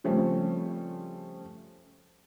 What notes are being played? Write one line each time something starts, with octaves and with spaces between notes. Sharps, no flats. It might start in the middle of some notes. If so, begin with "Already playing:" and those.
C#3 F3 G3 A3 C4 C#4